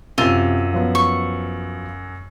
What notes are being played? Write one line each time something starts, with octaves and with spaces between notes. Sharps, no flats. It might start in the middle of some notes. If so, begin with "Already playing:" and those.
F#2 C3 F4 E6 D#7
F3 F#3 B3
C#6